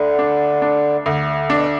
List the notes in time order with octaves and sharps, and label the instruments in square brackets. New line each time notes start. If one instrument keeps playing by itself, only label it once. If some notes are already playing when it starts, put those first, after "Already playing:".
Already playing: [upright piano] D2 [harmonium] D3
[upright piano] D4
D4
D2
[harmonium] B2 [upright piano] D4